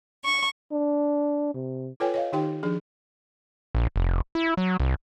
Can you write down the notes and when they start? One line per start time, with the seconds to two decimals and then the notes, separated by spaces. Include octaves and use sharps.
0.23 C#6
0.72 D4
1.54 C3
2.00 F4 A4 B4 C#5 G5 G#5
2.14 C#5 D#5 F5
2.32 D#3 D#4 G4 G5 C6
2.63 F3 D4 G#4
3.75 A#1
3.96 F1
4.35 E4
4.57 F#3
4.80 C2